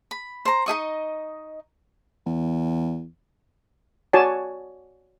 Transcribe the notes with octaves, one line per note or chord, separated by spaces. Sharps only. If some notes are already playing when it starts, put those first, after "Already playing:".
B5
C5 A#5
D#4 G#4 D#5 C#6
E2
F#4 C#5 D5 G#5 A5